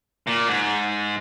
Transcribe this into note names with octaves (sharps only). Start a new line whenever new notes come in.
A#2
G#2